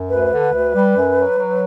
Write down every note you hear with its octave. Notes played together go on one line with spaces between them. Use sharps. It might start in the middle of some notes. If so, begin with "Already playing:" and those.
Already playing: F#2
D2 B4
D3
D2
G3
F#2
F#3
F#3